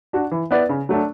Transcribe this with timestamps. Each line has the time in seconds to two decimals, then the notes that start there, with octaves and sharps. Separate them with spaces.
0.13 D4 F#4
0.31 E3
0.51 B3 E4 B4 D5
0.69 C#3
0.89 F#3 A3 D4